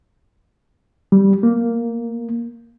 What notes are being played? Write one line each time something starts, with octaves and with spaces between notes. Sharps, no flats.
G3
A#3